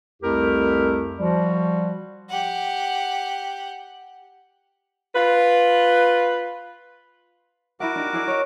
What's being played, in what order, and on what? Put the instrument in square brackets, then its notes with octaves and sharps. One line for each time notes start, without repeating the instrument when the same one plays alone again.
[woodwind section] C2 F2 A3 E4 G4 A#4
F3 G3 F#4
[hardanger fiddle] G4 F#5
[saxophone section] F4 B4
[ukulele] E4 E5 F#5 [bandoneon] F#4 A#4 D6
[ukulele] D4 D#4 G4
E4 G#4 D5
C#5 D#5